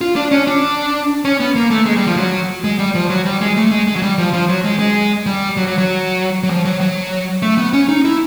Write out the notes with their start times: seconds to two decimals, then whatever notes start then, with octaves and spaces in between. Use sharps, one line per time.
0.01 F4
0.16 D4
0.31 C#4
0.47 D4
1.25 C#4
1.40 B3
1.56 A#3
1.71 A3
1.86 G#3
1.97 G3
2.07 F3
2.17 F#3
2.64 G#3
2.79 G3
2.95 F3
3.10 F#3
3.26 G3
3.41 G#3
3.57 A3
3.71 G#3
3.87 G#3
3.96 F#3
4.02 G3
4.18 F3
4.33 F3
4.49 F#3
4.64 G#3
4.79 G#3
5.26 G3
5.57 F#3
5.67 F#3
5.78 F#3
6.43 F#3
6.50 F3
6.65 F#3
6.81 F#3
7.42 A3
7.58 B3
7.73 C#4
7.88 D#4
8.05 E4